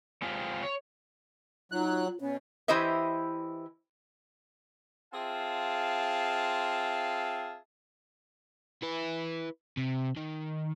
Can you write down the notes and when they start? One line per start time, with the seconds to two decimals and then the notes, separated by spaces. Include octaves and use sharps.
0.22 G#3 C4 F4 G4
0.63 C#5
1.72 F#3 D#4 F4 F#6
1.88 F4
2.21 B2 C#4 C#5
2.68 E3 E4 G4 C5 D#5 E5
5.14 C4 F4 G#4 E5 F5 A5
8.82 E4 B4
9.77 C3
10.17 D#3